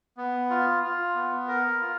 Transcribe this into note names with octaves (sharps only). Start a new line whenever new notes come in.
B3
F4
F4
B3
A#4
F4